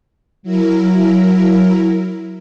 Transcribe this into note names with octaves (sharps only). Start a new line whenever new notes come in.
F#3 E4 A#4